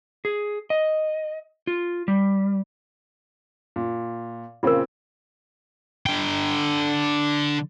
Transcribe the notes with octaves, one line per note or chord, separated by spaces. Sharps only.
G#4
D#5
F4
G3
A#2
A#2 C#3 C4 F4 A#4
D3 G5